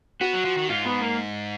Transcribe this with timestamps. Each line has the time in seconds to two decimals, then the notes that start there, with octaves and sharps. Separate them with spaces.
0.21 B3 F#4
0.33 F#3
0.45 F3
0.57 D#3
0.69 G#2 F4
0.85 B3
1.02 A#3